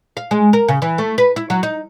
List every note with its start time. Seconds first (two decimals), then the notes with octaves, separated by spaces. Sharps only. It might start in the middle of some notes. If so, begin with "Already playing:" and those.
0.17 F5
0.31 G#3
0.53 A#4
0.69 C#3
0.82 E3
0.98 A3
1.18 B4
1.36 E4
1.50 F#3
1.63 D#4